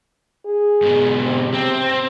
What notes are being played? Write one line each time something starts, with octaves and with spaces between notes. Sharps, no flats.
G#4
G#2 B2
C3
C4